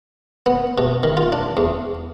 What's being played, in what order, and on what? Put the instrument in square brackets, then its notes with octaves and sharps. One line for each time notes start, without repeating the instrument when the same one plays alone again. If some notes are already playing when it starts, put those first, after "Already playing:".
[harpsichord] B3
B2
D#3
F4
D4
E2